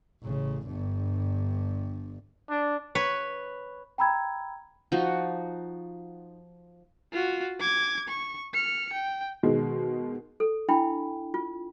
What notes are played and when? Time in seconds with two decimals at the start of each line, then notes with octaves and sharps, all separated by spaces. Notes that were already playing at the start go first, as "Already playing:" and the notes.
0.22 A1 C#3
0.66 G1 G2
2.50 D4
2.95 B4 C#5
3.98 G5 A#5 B5 E6 G#6
4.92 F3 D#4 F#4
7.13 F4 F#4
7.60 D6 G#6
8.08 C#6
8.54 F6 C#7
8.93 G5
9.43 B2 D#3 G#3
10.40 A4
10.69 D4 E4 G5 B5
11.34 F4